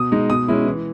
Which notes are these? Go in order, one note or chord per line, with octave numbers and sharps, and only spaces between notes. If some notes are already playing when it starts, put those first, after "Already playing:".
Already playing: B2 D#6
G#3 D#4
B2 D#6
G#3 C#4 E4
E3